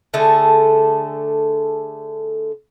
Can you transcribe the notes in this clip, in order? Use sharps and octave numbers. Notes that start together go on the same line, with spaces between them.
D3 A3 G#4 A4